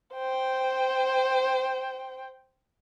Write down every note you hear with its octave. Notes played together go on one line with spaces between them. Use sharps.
C5 G5